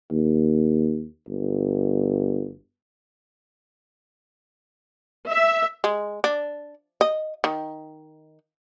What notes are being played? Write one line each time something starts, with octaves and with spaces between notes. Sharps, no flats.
D#2
G1
E5
G#3
D4
D#5
D#3